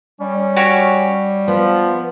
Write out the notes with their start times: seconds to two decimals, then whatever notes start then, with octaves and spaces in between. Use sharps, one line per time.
0.21 G3 C#4
0.56 F#4 G4 C#5
1.48 F3 B3